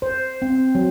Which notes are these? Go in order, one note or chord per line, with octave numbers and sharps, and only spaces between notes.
C5
C4
F#3